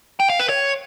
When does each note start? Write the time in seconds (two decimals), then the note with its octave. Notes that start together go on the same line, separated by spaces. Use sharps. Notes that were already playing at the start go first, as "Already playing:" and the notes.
0.20 G5
0.30 F5
0.39 B4
0.49 C#5